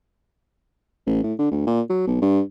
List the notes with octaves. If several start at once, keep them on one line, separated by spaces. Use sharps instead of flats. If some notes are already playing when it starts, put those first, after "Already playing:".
A1
A2
D3
D2
A#2
F#3
B1
G2